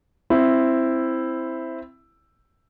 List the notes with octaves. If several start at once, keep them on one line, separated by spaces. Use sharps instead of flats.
C4 E4